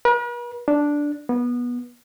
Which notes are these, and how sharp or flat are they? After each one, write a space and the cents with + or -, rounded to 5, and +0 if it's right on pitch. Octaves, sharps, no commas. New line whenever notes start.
B4 -45
D4 -5
B3 -20